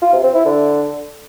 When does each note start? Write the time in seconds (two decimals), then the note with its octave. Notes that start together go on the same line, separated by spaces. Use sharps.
0.02 F4
0.13 C3
0.23 C4
0.34 E4
0.45 D3